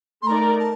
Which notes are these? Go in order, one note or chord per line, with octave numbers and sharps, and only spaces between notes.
C6
A3 D#4 A#4 D5 A#5
A5